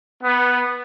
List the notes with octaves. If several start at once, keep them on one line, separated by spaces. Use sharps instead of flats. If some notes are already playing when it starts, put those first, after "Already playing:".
B3